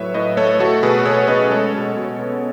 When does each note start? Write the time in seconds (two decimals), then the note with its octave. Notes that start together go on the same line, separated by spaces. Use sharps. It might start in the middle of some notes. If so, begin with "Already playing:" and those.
Already playing: A2 F#3 B4 C#5 E5
0.14 A2 B4 D#5
0.37 A3 A4 C#5
0.60 A3 F#4 A4
0.83 B2 G#4 B4
1.05 B2 A4 C#5
1.28 C#4 B4 D#5
1.51 G#3 A4 C#5
1.74 B2
1.81 A4 C#5
1.96 B2
2.19 B3